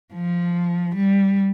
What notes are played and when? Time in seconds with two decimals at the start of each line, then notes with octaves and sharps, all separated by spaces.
0.14 F3
0.96 G3